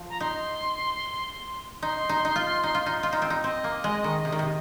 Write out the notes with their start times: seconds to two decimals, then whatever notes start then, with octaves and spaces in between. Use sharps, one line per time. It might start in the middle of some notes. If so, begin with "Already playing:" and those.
Already playing: F3
0.09 A#5
0.20 D#4 C6
1.82 D#4 C6
2.09 D#4
2.25 D#4
2.36 F4
2.63 D#4
2.75 F4
2.86 D#4
3.03 F4
3.13 D#4
3.22 C4
3.30 D#4
3.44 C4 D#5
3.64 A#3
3.84 G#3
4.04 D#3
4.25 C3
4.32 D#3
4.39 C3